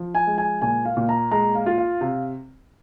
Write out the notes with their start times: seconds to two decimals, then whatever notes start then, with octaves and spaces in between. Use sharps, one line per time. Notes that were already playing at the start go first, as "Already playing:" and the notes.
Already playing: F3
0.15 G#5
0.27 G#3
0.38 G#5
0.61 A#2 G#5
0.85 F5
0.97 A#2
1.09 A#5
1.31 G#3 A#5
1.55 F5
1.66 F4
1.78 F5
2.01 C3 F5